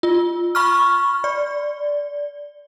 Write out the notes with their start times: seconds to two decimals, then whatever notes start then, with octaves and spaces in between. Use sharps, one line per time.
0.03 F4
0.55 B5 C#6 F6
1.24 D5